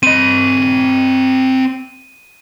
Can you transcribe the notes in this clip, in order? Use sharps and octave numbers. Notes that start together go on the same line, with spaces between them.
C4 D#5 D#7